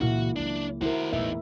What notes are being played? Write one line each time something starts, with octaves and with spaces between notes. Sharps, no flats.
C#2 A#2 E3 A#3 E4 F#4
F3 F#3 D4
D#3 E4 F#4 A#4 C5
A#1 E2 A2 B3 D#4 E5